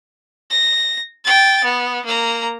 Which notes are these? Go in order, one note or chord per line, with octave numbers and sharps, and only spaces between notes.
A#6
G5 A6
B3
A#3 A#5